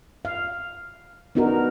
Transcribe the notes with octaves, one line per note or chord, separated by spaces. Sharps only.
F5
B3 D4 D#4 F#4 A#4